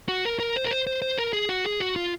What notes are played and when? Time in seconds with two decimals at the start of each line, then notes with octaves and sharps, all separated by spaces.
0.08 F#4
0.25 A#4
0.40 A#4
0.56 C5
0.66 A#4
0.71 C5
0.87 C5
1.02 C5
1.18 A#4
1.33 G#4
1.49 F#4
1.65 G#4
1.80 F#4
1.96 F4